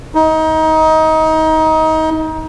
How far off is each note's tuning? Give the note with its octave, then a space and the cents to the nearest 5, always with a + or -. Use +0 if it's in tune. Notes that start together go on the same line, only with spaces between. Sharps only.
D#4 +25